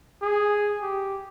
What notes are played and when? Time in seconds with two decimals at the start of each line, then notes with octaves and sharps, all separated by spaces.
0.22 G#4
0.82 G4